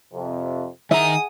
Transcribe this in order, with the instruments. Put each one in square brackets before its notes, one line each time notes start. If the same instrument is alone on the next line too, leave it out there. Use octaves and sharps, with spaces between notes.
[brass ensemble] F2 C3
[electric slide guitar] D#3 A#5 [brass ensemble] G#4 F#5 G#5 [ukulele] E5 [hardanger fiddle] D#6